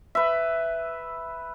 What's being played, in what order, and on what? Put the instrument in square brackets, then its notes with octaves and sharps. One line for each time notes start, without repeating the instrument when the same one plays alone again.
[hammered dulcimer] B4 E5